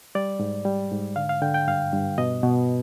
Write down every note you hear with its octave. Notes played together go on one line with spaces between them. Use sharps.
G3 D5
G#2
G3
G#2
D3 F5
F5
D3 G5
G5
G2 F5
G2
B2 D#5
B2